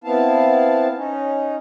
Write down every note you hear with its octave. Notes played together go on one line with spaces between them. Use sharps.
B3 C4 E4 F5 A5
C#4 D#4